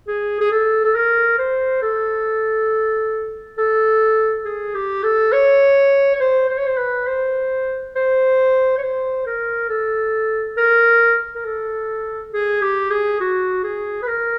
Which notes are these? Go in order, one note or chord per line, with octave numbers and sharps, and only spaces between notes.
G#4
G#4
A4
A4
A#4
C5
A4
A4
G#4
G4
A4
C#5
C#5
C5
C5
C#5
C5
B4
C5
C5
C#5
C5
A#4
A4
A#4
A#4
A4
G#4
G4
G#4
F#4
G#4
B4
A#4